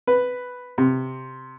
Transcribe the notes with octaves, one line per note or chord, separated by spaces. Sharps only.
B4
C3